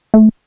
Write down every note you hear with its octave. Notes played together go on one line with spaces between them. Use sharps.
A3